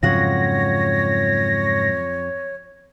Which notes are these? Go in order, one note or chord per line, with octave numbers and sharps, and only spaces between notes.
F2 G#2 C#3 F#3 F4 C#5 F#5 A#6